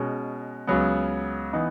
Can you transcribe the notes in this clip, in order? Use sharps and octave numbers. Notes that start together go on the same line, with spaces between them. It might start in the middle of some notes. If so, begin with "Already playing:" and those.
Already playing: B2 G#3 C#4
C#2 C#3 F#3 B3
E3 B3 D#4